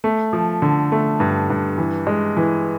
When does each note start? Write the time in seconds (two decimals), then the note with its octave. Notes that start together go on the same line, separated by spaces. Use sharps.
0.04 A3
0.33 F3
0.62 D3
0.92 A3
1.20 G2
1.50 G2
1.78 E3
2.07 G#3
2.37 E3